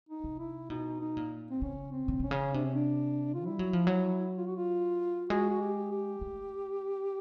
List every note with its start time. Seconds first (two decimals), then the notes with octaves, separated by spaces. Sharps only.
0.09 D#4
0.24 C3
0.39 E4
0.70 B2 D#4
1.01 D#4
1.17 A#2
1.51 C4
1.62 C#3 C#4
1.92 C4
2.08 C#3
2.19 C3 C#4
2.31 C#3
2.53 C3 D4
2.65 C#4
2.75 D4
3.35 F4
3.46 G3 E4
3.59 F#3
3.73 F3
3.87 F#3
4.38 F4
4.47 F#4
4.57 F4
5.30 G#3 F#4
5.50 F#4
5.61 G4
5.91 G4
6.21 A3